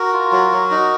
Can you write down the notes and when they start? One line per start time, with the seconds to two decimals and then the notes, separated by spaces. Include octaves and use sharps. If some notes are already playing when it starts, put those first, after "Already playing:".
Already playing: F#4 A#4
0.13 F4
0.32 F#3
0.52 F#3
0.71 D#4